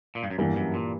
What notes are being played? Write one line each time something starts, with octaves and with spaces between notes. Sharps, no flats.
A#2
G2
F#2
E2 G2 E3 G3 A#3
F#2
A#2